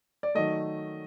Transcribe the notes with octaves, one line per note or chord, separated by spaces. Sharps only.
D5
D#3 F#3 A3 D#5